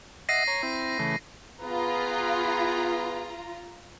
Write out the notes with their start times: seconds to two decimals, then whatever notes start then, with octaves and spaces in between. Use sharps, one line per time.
0.29 D#5 E5 F#5 A#6 C7 D#7
0.47 C#5 A#5
0.63 C4 E4
0.99 C#3 E3 A3
1.62 B3 F4 G#4 B4 A#5